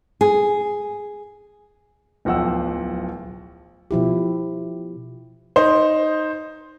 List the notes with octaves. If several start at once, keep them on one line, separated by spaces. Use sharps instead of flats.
G#4
D1 B1 F3 F#5 G5 E6
B2 F3 E4 G4
D#4 C5 C6